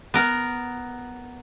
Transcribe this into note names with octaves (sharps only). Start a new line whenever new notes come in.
B3 A#4